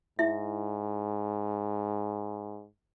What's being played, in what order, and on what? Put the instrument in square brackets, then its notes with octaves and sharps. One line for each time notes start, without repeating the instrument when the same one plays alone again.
[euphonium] G#2 [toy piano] E4 E5